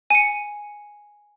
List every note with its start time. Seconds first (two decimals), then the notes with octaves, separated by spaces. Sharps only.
0.10 G#5 C#7